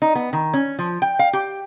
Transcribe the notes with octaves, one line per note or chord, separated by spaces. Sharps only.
D#4
B3
D#3
C#4
F3
G5
F5
G4